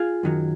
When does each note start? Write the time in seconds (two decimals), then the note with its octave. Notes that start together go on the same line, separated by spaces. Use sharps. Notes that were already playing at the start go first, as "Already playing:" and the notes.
Already playing: F4 G#4
0.23 F#2 D#3 F#3